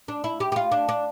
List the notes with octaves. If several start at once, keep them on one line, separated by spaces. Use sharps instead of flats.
D4
E4
G4
G4
F4
D4
D4